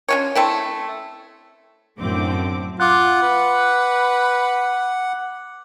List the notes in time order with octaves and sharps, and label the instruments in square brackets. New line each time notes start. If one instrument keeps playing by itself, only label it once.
[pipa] C#4 F4 C#5
A3 C4 E4
[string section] F#2 A2 D3 C4 D6
[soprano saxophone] F4 [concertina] F#5 [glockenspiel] D6 F#6
[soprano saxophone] B4